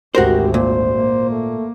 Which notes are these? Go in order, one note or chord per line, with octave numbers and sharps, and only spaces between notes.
G#1 D2 F#4 G4 A#4 C5
A#2 C5
A#3
A3